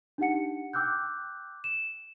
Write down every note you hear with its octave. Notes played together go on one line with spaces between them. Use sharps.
D4 D#4 G4 F#5 C#7
G5 D6 E6 F#6 G6
E7